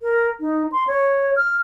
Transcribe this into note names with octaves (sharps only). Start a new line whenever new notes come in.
A#4
D#4
C6
C#5
F6